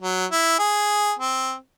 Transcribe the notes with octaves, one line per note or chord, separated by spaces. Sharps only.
F#3
E4
G#4
C4